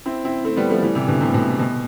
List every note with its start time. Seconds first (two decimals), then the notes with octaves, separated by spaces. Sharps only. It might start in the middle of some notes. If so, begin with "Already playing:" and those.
0.06 C4 E4
0.25 C4 E4
0.45 A3 C4
0.57 G3 B3
0.70 F3 A3
0.83 E3 G3
0.95 C3 E3
1.08 B2 D3
1.21 A2 C3
1.34 B2
1.47 A2
1.59 B2